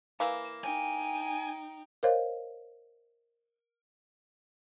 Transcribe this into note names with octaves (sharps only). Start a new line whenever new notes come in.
E3 A#3 E7
D#4 G5 G#5
A#4 C5 C#5 D#5 F5